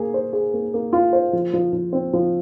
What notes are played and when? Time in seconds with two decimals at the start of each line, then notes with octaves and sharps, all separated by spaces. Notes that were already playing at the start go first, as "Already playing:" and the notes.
Already playing: A#3 G#4
0.14 C5
0.33 G#4
0.54 A#3
0.74 A#3
0.93 F4
1.13 C5
1.33 F3
1.53 F3
1.73 F3
1.93 C4
2.13 F3